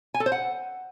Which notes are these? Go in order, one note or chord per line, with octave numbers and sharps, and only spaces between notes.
G#5
A4
C5
F#5